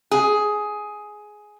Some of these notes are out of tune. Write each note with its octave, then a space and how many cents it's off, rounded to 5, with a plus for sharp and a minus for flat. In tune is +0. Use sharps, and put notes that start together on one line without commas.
G#4 +10